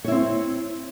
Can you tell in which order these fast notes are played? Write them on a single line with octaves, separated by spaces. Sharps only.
C#5 E4 C4